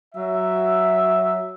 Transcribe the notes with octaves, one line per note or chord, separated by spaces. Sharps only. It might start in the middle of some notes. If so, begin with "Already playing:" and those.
F#3 E5